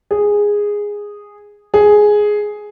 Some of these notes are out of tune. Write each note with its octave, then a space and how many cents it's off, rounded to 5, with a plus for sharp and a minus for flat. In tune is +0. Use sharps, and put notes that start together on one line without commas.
G#4 -10
G#4 +5